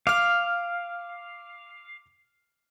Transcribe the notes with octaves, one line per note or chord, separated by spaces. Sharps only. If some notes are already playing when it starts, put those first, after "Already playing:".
F5 D6 F6